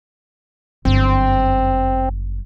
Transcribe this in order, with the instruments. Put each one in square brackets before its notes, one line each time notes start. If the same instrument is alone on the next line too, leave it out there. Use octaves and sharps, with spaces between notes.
[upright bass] G1 F#2 [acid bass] C4